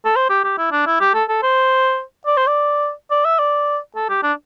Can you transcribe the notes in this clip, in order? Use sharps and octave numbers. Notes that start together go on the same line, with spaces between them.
A4
C5
G4
G4
E4
D4
E4
G4
A4
A4
C5
D5
C5
D5
D5
E5
D5
A4
G4
D4